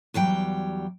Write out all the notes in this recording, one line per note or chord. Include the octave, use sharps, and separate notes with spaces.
E2 F#3 G3 G5